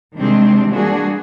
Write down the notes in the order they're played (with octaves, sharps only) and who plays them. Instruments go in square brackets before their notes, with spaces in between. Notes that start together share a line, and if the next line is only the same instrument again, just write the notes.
[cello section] C3 D#3 G3 G#3 C4 D4
E3 G3 A#3 D4 F#4 G#4